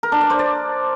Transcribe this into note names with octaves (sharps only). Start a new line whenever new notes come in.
A#4
D4
D5
C5
D5